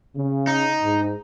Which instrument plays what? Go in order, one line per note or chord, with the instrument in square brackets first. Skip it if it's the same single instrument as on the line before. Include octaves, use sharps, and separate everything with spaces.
[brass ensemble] C#3
[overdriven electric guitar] D#4
[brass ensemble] G#2